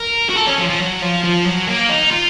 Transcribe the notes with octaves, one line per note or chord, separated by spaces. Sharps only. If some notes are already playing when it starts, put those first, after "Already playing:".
Already playing: A#4
F#4
A4
C#4
F3
F3
F#3
F3
F3
F#3
A#3
D#4
F4